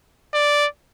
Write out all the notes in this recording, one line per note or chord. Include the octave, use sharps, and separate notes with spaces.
D5